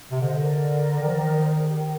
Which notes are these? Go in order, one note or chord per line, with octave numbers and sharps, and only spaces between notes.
C3
D3 C5 D#5
A#4 D5
D#3
F3
D#3
C5
A#4
G#4
G4
A#4